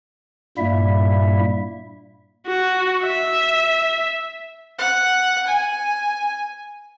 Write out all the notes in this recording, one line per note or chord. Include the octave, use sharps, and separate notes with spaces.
G2 A#2 G3 A#3 E4 E5
F#4
E5
F#5
G#5